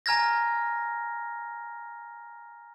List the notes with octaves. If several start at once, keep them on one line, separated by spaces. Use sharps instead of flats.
G#5 A#5 F6 G#6 A#6